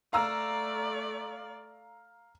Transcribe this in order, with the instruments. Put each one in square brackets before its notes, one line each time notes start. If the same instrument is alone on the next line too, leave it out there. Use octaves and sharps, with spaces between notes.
[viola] A3 D5 [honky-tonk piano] F5 A#5 E6